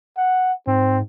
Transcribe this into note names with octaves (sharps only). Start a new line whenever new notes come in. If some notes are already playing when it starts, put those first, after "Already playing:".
F#5
G#2 C4